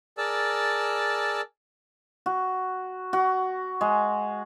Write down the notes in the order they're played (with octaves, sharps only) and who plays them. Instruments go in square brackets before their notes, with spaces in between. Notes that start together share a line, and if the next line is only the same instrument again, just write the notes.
[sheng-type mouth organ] G#4 A#4 D5 A5 E6
[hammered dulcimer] F#4
F#4
G#3